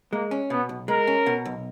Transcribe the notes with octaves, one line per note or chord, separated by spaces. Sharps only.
G#3 A#3
C#4
B2 B3
B1
G#3 A#4
C#4
B2
B1